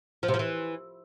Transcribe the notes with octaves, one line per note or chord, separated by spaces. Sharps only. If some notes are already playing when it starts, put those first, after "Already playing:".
F3
C3
F3
E3